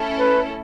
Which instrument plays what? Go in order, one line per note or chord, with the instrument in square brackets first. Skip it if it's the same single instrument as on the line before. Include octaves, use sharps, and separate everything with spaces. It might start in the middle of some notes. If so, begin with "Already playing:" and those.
Already playing: [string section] A3 C#4 E4 A4
[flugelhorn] B4